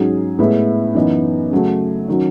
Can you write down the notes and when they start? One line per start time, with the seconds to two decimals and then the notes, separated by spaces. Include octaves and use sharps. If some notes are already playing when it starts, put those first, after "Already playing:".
Already playing: G#2 F#3 C#4 G#4
0.39 A2 G#3 B3 E4
0.95 F#2 E3 B3 D#4
1.51 C#3 F#3 A3
2.09 D#3 F#3 C#4